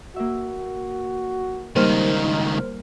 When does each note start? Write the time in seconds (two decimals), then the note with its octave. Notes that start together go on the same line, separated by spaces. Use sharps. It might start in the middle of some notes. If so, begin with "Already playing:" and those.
0.16 A#3 F#4 E5
1.76 C#2 D#3 G3 A#3 D#4 A#4 C5 F6